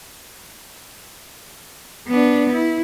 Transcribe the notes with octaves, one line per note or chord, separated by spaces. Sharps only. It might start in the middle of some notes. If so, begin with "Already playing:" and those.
B3 D4
E4